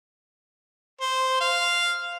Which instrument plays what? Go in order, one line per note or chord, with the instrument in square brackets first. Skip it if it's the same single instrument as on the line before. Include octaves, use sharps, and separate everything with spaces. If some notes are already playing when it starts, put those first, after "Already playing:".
[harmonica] C5
F5